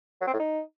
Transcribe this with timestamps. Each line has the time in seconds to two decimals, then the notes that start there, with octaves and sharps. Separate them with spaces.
0.21 F#3
0.27 C4
0.33 A2
0.40 D#4